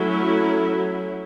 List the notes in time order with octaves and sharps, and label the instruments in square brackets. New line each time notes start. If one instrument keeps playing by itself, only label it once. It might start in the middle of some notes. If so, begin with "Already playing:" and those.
Already playing: [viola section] F#3 A3 C#4 E4